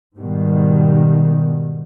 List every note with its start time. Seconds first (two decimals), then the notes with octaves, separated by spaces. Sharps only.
0.17 G#2 B2 D#3 G3